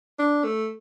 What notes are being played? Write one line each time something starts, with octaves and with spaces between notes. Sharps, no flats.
D4
A3